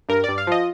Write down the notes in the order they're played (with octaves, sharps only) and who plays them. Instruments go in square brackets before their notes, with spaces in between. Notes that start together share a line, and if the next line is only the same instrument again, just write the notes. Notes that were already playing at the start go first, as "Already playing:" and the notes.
[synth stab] G2 A#4
G2 D5
F5
F3 D#5